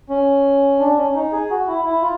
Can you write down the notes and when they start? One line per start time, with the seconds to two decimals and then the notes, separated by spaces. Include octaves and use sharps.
0.10 C#4
0.80 D4
0.97 C#4
1.14 D#4
1.32 G#4
1.50 F#4
1.67 E4
1.85 E4
2.02 F4